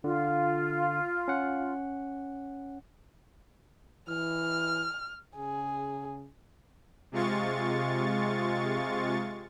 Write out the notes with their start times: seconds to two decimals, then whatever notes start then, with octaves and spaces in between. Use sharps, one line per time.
0.04 D3 F4
1.28 C#4 F#5
4.09 E3 F6
5.36 C#3 G#4
7.12 C3 G#3 F4 C#6 A6